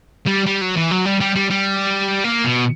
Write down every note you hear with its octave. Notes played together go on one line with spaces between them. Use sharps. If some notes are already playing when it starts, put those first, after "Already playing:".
G3
G3
F#3
E3
F#3
G3
G3
G3
G3
A#3
B2